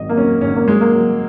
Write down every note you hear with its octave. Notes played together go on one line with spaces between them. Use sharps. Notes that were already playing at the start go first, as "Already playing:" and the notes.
Already playing: G#1 F#3 D#5
A#3
F#3 C#4
G#1 C#4
A#3
F#3 G#3
A#3
F#3